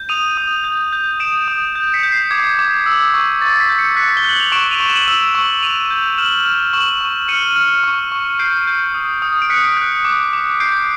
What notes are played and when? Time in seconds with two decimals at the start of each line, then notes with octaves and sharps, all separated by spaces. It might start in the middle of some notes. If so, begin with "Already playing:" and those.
Already playing: G6
0.09 D#6 D#7 F7
0.37 D#6
0.64 G6
0.93 G6
1.20 D#6 D7 E7
1.48 D#6
1.75 G6
1.94 B6 C#7
2.03 G6
2.12 C7
2.31 D6 G#6
2.59 D6
2.86 E6
3.14 C#6
3.41 C#6 A6
3.60 B6
3.69 G6
3.78 B6 C#7
3.96 F#6 B6 C#7
4.17 G7
4.24 F#6 F#7
4.40 F7
4.52 C#6 D7 E7
4.71 D#7 F7
4.80 C#6
4.89 E7 F#7
5.07 E6
5.35 C#6
5.62 C#6 D#7 F7
5.90 G6
6.18 F6 E7 F#7
6.45 F6
6.73 C#6 E7 F#7
7.01 C#6
7.28 F6 C#7 D#7
7.56 F6
7.84 C#6
8.12 C#6
8.39 G6 C7 D7
8.67 G6
8.94 D#6
9.22 D#6
9.42 D7
9.50 F#6 B6 C#7
9.77 F#6
10.05 D6
10.33 D6
10.60 G6 C7 D7